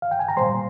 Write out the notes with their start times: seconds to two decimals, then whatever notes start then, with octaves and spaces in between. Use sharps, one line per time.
0.02 F5
0.11 G5
0.20 G#5
0.28 A#5
0.37 A#2 G3 C5 C6